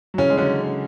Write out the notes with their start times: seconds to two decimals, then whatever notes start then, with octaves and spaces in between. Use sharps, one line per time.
0.14 F#3
0.18 C#3 E3 C#4
0.30 G#3
0.37 D3 F#3 C#4